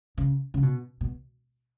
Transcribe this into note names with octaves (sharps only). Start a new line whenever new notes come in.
C#3
C#3
B2
B2